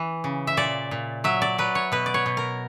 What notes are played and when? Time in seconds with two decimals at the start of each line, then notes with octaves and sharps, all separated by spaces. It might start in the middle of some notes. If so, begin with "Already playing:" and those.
Already playing: E3
0.24 C#3
0.47 E5
0.57 A#2 D5
0.91 A#2
1.24 F#3 E5
1.42 D5
1.58 F#3 B4
1.75 C#5
1.92 B2 B4
2.06 D5
2.14 C#5
2.26 B2
2.37 A#4